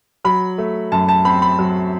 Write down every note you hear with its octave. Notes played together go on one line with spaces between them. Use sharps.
F#3 B5
A3
F#2 A5
A5
C4 B5
B5
F#3